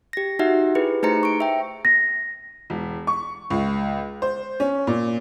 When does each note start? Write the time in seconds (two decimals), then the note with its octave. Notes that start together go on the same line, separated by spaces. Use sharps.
0.13 G4 A#6
0.39 D#4 F#4 E5 F#5
0.75 E4 G4 G#4 B4
1.03 A3 D#4 G#4 C5 A#5 C#7
1.23 C#6 D7
1.40 E5 G5
1.85 A#6
2.70 E1
3.07 C#6
3.50 C#2
4.22 C5
4.60 C#4
4.87 A#2